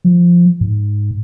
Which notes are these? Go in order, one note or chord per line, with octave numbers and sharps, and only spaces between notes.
F3
G#2